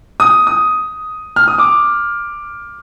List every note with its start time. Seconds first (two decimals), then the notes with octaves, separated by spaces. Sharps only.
0.20 D#6
0.47 D#6
1.36 F6
1.48 D#6
1.58 D6